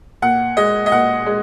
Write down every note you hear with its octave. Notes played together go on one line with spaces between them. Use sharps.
A#2 F#5
G#3 D#5
D#5
A#2 F#5
G#3